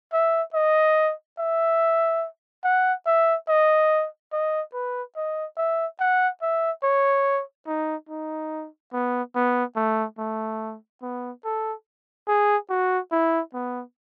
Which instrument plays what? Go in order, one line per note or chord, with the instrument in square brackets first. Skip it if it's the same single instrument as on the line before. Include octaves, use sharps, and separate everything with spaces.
[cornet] E5
D#5
E5
F#5
E5
D#5
D#5
B4
D#5
E5
F#5
E5
C#5
D#4
D#4
B3
B3
A3
A3
B3
A4
G#4
F#4
E4
B3